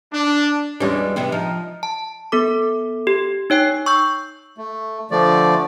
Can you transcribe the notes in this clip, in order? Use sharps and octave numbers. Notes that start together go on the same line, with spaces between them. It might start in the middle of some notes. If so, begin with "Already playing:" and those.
D4
E2 B2 G3 G#3 C#4 D4
C3 B3 G4 E5
F3 D#4
A5
B3 A4 D6
G4
D#4 C#5 G5 C7
C#6 E6 G6
A3
D3 F3 A3 D5